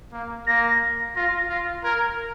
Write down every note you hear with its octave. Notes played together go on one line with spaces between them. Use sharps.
A#3
A#3 A#6
F4 A#6
F4
A#4 G#6